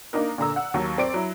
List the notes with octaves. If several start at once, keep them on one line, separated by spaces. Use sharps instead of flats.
A#3 D4 D#4 A#4
A#2 D3 A#5 E6
F#5
D#2 F#3
C4 D5 D7
F#3 E4